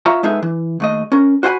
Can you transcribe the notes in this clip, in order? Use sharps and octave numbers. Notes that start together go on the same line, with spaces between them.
F4 C#5 E5 A#5
G#3 B3 D#4 G#4 A4 E5
E3
D#2 A3 D#5
C#4 A#4
F#4 C5 C#5 G5 G#5 B5